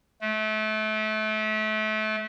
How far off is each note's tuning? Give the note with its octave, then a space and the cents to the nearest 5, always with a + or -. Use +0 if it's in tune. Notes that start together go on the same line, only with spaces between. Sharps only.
A3 -30